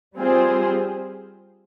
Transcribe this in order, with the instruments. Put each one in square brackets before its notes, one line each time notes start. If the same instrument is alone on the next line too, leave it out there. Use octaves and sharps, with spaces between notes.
[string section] G3 C4 F4 G#4 C5